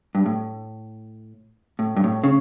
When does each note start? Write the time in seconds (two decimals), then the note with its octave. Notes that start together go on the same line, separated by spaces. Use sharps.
0.15 G2
0.26 A2
1.79 A2
1.96 G2
2.04 A2
2.24 C#3